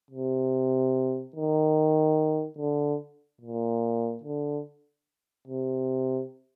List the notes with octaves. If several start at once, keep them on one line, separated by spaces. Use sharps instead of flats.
C3
D#3
D3
A#2
D3
C3